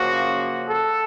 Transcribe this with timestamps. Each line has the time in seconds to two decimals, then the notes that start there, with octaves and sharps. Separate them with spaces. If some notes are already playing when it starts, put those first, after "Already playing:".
Already playing: F#2 C#3 F3 A#3 F#4
0.67 A4